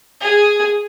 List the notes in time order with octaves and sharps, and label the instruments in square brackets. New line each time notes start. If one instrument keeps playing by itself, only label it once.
[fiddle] G#4